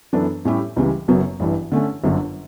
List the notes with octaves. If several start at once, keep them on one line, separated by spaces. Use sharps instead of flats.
F#2 E3 B3 D4 A4
A2 G3 C#4 E4 G4
C#2 C#3 E3 G3
F#1 F#2 C#3 F#3 B3
A1 G2 E3
D3 A3 C#4
G1 F#2 D3